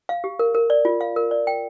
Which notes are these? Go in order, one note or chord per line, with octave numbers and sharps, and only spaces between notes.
F5
G4
A#4
A#4
D5
F4
F5
A#4
D5
G5